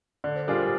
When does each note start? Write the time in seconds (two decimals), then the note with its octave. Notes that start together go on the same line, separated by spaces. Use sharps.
0.24 D3 D5
0.36 C5
0.47 G3 D4 F4 G#4 A#4
0.58 C5